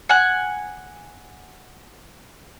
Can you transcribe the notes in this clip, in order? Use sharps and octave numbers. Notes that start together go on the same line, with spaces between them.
F#5 G#5 F#6